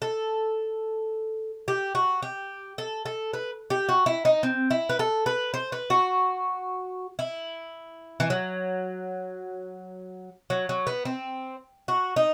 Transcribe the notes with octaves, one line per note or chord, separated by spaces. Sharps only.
A4
G4
F#4
G4
A4
A4
B4
G4
F#4
E4
D#4
C4
E4
B4
A4
B4
C5
B4
F#4
E4
E3
F#3
F#3
F#3
B3
C4
F#4
D#4